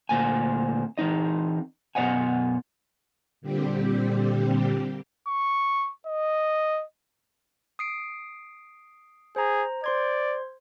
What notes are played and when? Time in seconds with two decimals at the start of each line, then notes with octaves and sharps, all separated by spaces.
0.09 D2 A#2 C4 G#5
0.98 E3 C4 D#4 D#5
1.95 F#2 B2 C#5 D#5 F#5 G#5
3.41 A#2 D3 G3 C4 G4
5.27 C#6
6.07 D#5
7.79 D#6 C7 D7
9.36 G#4 C5 A#5
9.84 C5 D5 C6 G#6